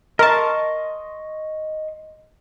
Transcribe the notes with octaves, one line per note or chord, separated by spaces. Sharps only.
A#4 D#5 A5 C6 C#6